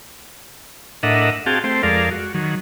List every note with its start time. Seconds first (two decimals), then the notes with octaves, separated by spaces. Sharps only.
1.03 A2 D4 A#4 D#5 E5 F#5
1.46 C4 F#4 G#4 F5 G5 A5
1.64 A3 C4 C5 G5
1.83 F2 G#3 A4 A#4 D5 F5
2.11 F#4
2.34 D#3 F#3